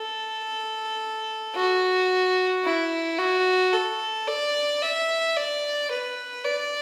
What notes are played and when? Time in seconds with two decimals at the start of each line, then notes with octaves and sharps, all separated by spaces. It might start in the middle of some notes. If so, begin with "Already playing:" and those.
Already playing: A4
1.56 F#4
2.64 E4
3.18 F#4
3.73 A4
4.28 D5
4.82 E5
5.37 D5
5.91 B4
6.45 D5